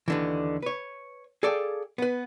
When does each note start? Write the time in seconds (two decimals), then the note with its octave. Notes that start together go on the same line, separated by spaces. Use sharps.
0.08 D#2 D3 E3
0.62 B4 C#5
1.43 G#4 A4 D5 F5 G5
1.98 B3 B4